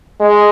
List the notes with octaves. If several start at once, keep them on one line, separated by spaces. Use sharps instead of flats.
G#3